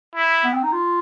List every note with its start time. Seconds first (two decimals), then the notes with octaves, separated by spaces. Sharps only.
0.16 E4
0.44 B3
0.54 C4
0.63 D#4
0.72 F4